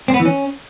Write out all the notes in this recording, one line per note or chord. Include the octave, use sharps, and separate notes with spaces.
C4
B3
E3
C#4